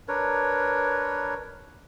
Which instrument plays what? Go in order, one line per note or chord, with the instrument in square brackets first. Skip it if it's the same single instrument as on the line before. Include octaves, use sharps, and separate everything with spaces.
[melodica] D4 A#4 B4 C#5